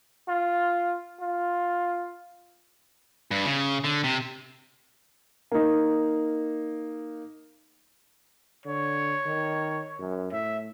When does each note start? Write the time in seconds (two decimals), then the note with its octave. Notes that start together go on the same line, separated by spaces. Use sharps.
0.28 F4
1.20 F4
3.31 G2
3.45 C#3
3.84 D3
4.04 C3
5.52 A#3 D#4
8.66 D3 C#5
9.26 D#3
10.00 F#2
10.32 A2 E5